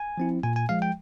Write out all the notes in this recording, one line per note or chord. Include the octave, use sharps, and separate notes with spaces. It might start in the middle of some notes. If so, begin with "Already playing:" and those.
Already playing: G#5
F3 C4 E4
A#2 G#5
G#5
F3 G#3 F5
G5